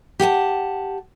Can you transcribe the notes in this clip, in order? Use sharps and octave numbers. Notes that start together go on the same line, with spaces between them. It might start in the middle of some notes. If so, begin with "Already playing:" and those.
G4 F#5 G5 A5